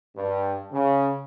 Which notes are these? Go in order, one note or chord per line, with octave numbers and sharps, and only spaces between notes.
G2
C#3